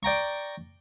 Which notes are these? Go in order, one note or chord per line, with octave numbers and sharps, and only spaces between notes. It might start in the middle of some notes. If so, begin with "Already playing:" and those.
D5 G5 A#5 C#6